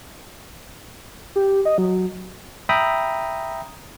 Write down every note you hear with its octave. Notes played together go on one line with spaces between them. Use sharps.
G4
D#5
F#3
E5 G5 A#5 B5 D#6